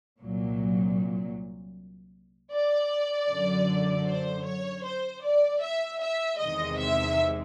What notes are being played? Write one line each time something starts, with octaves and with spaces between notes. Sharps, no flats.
C2 A#2 F#3
D5
F#2 D3 F#3
C5
C#5
C5
D5
E5
E5
E2 C3 D#3 G#3 D#5
E5